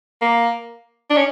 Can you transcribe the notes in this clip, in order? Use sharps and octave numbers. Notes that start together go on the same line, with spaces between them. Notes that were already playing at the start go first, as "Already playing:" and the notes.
A#3
D4
C#4